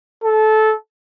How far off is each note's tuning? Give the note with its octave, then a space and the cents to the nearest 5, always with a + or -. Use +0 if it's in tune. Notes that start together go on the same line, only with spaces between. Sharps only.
A4 -20